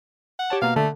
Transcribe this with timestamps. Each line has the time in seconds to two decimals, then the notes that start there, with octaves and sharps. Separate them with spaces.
0.39 F#5
0.50 G4 C#5 A5
0.62 B2 A#3 F5
0.76 D3 A3